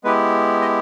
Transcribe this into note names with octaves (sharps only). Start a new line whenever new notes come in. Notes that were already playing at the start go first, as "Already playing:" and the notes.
G#3 B3 E4 G4 B4
D#5